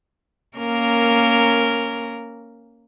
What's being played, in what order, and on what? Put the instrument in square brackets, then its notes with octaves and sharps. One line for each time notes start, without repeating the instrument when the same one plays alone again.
[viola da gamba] A#3 C#4 A#4